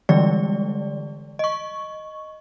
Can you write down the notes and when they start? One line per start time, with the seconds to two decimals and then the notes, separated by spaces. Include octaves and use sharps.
0.09 D3 E3 G3 G#3 D5
1.39 D#5 C#6